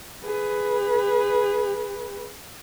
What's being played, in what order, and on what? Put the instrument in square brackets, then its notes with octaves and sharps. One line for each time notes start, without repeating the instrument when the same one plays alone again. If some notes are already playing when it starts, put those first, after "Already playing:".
[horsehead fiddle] G#4 B4